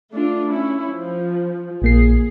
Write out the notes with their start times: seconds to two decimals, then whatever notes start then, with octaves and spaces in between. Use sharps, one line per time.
0.13 A3 D4 F4
0.51 C#4 E4
0.88 F3
1.82 A#1 A#3 G#4 C7